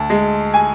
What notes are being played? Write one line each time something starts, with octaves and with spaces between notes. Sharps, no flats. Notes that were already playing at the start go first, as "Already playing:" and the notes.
Already playing: D2 A5
G#3
G#5